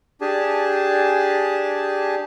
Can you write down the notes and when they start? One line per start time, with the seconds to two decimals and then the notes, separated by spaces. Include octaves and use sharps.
0.21 D4 G4 G#4 G#5 A5